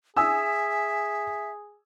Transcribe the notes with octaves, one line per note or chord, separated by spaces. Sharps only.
G#4 E5 G#5 D#6 E6